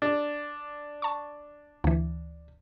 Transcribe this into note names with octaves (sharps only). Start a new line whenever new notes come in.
D4
A5 C#6
D2 E3